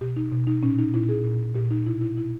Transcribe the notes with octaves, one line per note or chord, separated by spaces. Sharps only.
B2 G4
D#4
B2
D#4
A#2 C#4
D#4
A#2 E4
G#4
A#2
A#2 G4
D#4
B2 E4
E4
B2 E4